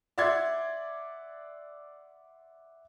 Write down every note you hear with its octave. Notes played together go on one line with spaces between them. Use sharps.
D5 E5 F#5 C6 G#6